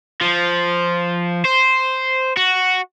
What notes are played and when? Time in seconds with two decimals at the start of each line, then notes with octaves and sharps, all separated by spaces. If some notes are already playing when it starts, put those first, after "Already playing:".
0.21 F3
1.45 C5
2.37 F#4